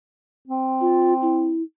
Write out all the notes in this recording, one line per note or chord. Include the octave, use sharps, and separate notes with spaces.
C4
F4
E4